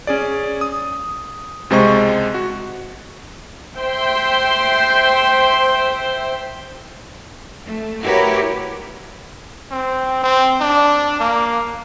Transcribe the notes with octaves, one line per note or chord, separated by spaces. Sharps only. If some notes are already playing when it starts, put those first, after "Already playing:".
C#4 G#4 D5
D#6
C#2 C3 G#3 C5 D#5 C#6
F#4
C5 E5 G5 C6
A3
E4 F#4 G4 A#4 B4 C#5
C4
C4
D4
A#3